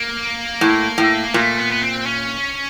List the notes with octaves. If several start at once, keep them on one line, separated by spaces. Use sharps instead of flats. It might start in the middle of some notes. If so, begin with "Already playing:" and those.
Already playing: A#3
A2
A2
A#2 A3
B3
B3
C4
C#4